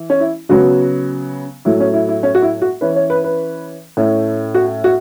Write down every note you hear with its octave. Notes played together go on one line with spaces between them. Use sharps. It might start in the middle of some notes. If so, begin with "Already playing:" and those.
Already playing: E3
C#4
E4
C#3 F#3 B3 F#4
A2 F#3 A3 E4
C#4
E4
E4
C#4
F#4
E4
F#4
E3 C#4 B4
C#5
B4
B4
A2 A3 C#4
F#4
F#4